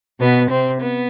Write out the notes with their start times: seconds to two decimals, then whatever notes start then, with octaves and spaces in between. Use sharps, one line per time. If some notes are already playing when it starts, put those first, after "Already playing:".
0.20 B2 B3
0.49 C3 C4
0.80 B3